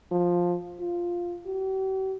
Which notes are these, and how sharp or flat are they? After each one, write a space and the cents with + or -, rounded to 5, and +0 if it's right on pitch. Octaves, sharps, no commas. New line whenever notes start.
F3 +10
F4 +0
G4 -45